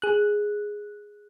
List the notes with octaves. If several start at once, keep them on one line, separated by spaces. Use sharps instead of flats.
G#4 F#6